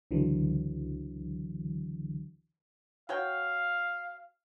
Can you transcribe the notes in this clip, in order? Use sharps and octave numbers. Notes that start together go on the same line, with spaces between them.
C#2 D3 E3 F#3
F#4 C#5 F5 G5